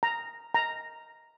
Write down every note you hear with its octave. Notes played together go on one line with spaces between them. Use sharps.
A#5
A#5